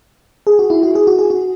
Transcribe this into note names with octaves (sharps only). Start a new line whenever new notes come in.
G#4
F#4
E4
F#4
G#4
F#4
G#4
F#4